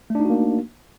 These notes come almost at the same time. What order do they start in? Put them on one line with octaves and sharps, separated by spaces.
A3 D4 D#4 F#4 A#3